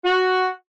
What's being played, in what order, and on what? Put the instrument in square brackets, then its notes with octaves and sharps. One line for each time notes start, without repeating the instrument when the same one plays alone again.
[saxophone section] F#4